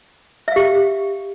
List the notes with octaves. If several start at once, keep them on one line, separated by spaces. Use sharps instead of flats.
G4 E5 F5